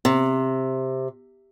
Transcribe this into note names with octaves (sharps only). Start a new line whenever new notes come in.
C3